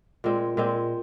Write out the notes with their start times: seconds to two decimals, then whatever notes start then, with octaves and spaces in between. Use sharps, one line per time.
0.24 A#2 G#3 C4
0.57 A#2 G#3 C4